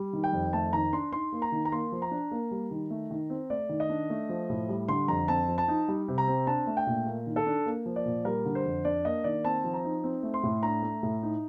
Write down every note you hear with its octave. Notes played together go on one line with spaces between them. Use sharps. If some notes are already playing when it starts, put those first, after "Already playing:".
Already playing: G3
D#3
G5
F2
A3 A5
D#3 A#5
D4 C6
D#4 C6
A#3
A#5
D#3
A#5
A#3 C6
F3
A#5
D4
A#3
G3
D#3
A3
D#3
C4
A3 D5
D#3
D#5
D4
A3
F3
A2
G3
D3 C6
F2 A#5
C4 A5
F3
A5
D#4
G3
C3
A#5
C4
D4 A5
A3
G5
A#2
A#3
D#3
A4
D4
A#3
F3
D5
A#2
G3 A#4
D3
C5
F2
D4 D5
A#3 D#5
D#3 D5
C4 A5
F3
A#5
D#4
C4
A3
C6
A2
D4 A#5
A3
A2
D#4